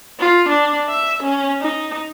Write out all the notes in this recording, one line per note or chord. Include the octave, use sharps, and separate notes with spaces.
F4
D4
E5
C#4
D#4